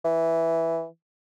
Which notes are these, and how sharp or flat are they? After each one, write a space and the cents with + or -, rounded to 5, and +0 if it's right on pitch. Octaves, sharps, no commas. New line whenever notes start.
E3 +0